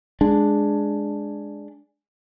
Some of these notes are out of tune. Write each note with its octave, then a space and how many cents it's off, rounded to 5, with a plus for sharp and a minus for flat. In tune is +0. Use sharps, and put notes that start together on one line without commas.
G#3 +0 D4 +0